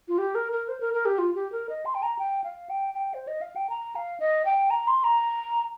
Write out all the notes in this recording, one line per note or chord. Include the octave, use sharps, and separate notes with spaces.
F4
G4
A#4
A#4
C5
A#4
A#4
G4
F4
G4
A#4
D#5
C6
G5
A#5
G5
F5
G5
G5
C5
D#5
F5
G5
A#5
F5
D#5
G5
A#5
C6
A#5